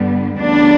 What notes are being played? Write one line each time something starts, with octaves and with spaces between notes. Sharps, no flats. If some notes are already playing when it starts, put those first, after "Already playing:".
Already playing: G2 D3 G3 B3
D2 C#3 E3 G3 B3 D4